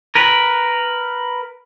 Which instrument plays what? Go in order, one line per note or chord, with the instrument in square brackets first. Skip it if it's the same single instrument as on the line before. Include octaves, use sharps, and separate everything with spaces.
[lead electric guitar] A#4 B4